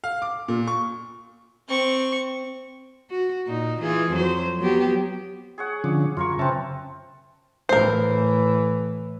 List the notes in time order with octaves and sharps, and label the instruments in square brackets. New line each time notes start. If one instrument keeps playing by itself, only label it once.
[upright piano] F5
D6
A#2
C#6
[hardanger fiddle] C4 C#6
[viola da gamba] F#4
A#2 D#4
E3 F4 G#4
F2 F#3 C5
F#3 B3 G4
[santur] G#4 C#5 F#5
[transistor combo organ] D3 F3 C#4 [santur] D6
[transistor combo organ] F#2 [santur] F4 A#4 C#6
[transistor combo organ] C#3 E5 A5 [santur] C4 B4 A#5
[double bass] A2 E3 [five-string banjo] A#4 C5